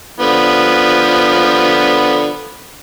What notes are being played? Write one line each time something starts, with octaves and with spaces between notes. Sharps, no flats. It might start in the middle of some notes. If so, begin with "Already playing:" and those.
D3 F3 B3